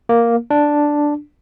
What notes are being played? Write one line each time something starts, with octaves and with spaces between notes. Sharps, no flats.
A#3
D4